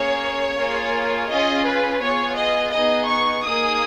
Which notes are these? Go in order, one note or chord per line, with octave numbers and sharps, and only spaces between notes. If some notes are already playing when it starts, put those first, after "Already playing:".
Already playing: A#3 C#4 G#4 C#5
A#3 F4 G#4
C#4 F4 G#4 D#5
B4
B3 F4 G#4 C#5
D#5
B3 D#4 G#4 D#5
C#6
A#3 D#4 G#4 D#6